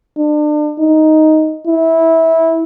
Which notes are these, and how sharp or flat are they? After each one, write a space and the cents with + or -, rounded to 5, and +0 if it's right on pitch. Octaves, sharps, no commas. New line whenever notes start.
D4 +35
D#4 +5
E4 -15